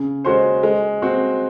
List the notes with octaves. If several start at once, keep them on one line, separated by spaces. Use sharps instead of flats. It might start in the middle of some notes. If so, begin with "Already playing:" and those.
Already playing: C#3
G#3 C#4 F#4 C5
G#3
C4 F#4